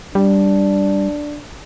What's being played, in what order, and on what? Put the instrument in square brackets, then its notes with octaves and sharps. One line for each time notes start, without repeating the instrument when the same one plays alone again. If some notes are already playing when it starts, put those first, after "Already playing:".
[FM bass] G3 [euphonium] D4